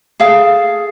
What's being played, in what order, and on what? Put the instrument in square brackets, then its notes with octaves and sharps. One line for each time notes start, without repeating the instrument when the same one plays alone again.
[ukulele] G#4 A4 F5